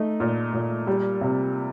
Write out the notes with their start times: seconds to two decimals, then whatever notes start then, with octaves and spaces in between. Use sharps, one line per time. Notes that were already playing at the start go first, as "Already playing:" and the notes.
Already playing: A3 D#4
0.20 A#2
0.54 A#2
0.87 G3
1.21 C3